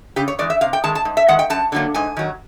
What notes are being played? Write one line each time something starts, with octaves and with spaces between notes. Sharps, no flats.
C#3 G4
C#5
E3 G#3 D5
E5
C3 F5
G5
D#3 G#3 A5
A5
G#2
E5
D#3 G#3 F#5
G5
F#2 A5
D3 F#3 A#3
G#2 G#5
D#3 F#3